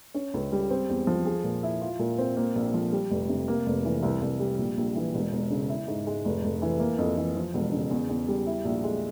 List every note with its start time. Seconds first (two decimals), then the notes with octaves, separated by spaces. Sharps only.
0.14 C#4
0.34 C#2
0.52 G3
0.70 C4
0.89 E2
1.07 F3
1.26 G#4
1.44 A#2
1.63 E4
1.81 F4
1.99 A#2
2.18 C4
2.37 A#3
2.55 A#1
2.74 F3
2.92 G3
3.11 F1
3.29 C3
3.48 A#3
3.66 F1
3.85 E3
4.03 C2
4.22 C2
4.40 G3
4.58 A#1
4.77 A#1
4.96 E3
5.14 E1
5.32 E1
5.51 C#3
5.69 E4
5.88 G#2
6.07 G#3
6.25 F1
6.44 F1
6.62 E3
6.80 A#3
6.98 F2
7.17 E3
7.36 F3
7.54 E1
7.72 C#3
7.91 E2
8.09 E2
8.28 G3
8.46 E4
8.65 A#1
8.84 G#3